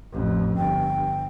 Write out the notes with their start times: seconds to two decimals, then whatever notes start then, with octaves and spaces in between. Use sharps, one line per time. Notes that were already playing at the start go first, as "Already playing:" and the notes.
0.12 A1 F2
0.57 G1 G5